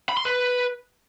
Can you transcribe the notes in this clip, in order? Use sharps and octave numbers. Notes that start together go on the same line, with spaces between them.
B5
C6
B4